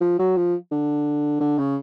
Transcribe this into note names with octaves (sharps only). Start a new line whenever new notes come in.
F3
F#3
F3
D3
D3
C#3